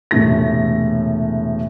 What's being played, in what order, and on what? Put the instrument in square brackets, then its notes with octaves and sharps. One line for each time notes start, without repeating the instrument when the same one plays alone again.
[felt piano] E1 A2 C3 A3 A#6